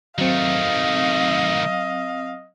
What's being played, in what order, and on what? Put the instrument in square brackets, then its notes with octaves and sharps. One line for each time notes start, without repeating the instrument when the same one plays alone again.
[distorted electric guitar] D#3 A3 [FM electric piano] F#3 C4 [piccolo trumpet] D#5 [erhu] F5